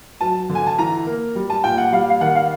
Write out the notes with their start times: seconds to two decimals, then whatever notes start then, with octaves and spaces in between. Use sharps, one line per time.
0.21 F#3 A5
0.49 D3
0.55 G#5
0.67 A5
0.79 E3 A#5
1.06 A#3
1.35 G3
1.50 A5
1.64 A#2 G5
1.78 F#5
1.92 G3 F5
2.10 F5
2.21 D#3 F#5
2.35 F5